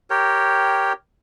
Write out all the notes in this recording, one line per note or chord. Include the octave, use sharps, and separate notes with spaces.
G4 A#4 C#5 G5